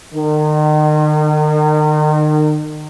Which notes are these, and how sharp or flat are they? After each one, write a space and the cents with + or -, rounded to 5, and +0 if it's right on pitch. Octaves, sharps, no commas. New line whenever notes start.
D#3 -35